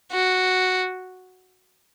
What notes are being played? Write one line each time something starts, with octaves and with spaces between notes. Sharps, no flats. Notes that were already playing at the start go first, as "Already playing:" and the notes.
F#4